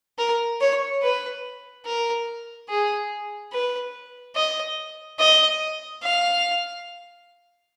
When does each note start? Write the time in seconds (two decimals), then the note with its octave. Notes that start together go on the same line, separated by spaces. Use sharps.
0.18 A#4
0.61 C#5
1.02 B4
1.86 A#4
2.69 G#4
3.52 B4
4.35 D#5
5.19 D#5
6.02 F5